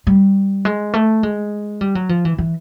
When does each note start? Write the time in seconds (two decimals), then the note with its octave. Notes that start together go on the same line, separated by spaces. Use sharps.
0.07 G3
0.65 G#3
0.94 A3
1.23 G#3
1.81 G3
1.95 F#3
2.09 F3
2.25 E3
2.38 E3